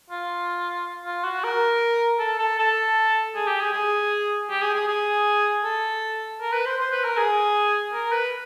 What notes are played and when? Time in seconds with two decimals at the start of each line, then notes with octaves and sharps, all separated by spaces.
0.10 F4
1.05 F4
1.24 F#4
1.44 A#4
2.20 A4
2.39 A4
2.59 A4
3.35 G#4
3.47 G4
3.61 G#4
3.73 G#4
4.50 G4
4.62 G#4
4.75 G#4
4.88 G#4
5.64 A4
6.41 A#4
6.53 B4
6.66 C5
6.79 C5
6.92 B4
7.04 A#4
7.17 G#4
7.94 A#4
8.13 B4